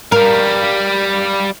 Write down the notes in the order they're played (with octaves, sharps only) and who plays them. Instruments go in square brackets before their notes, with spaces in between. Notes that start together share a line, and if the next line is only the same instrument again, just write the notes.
[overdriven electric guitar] G3 F5 [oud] A#4